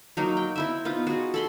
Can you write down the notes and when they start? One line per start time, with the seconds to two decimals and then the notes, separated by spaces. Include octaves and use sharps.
0.17 F#3 A#3 D#4
0.37 G5
0.56 C4 E4 E5
0.85 B3 D#4 F4
1.07 F#4 G#4
1.34 A4 B5 C6